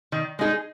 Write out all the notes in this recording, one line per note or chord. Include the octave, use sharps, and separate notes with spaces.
D#3
G#3 D#4 G#4